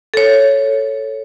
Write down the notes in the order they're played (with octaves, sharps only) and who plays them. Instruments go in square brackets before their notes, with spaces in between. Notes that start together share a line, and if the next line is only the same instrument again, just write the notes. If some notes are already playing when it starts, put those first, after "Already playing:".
[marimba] A4 C#5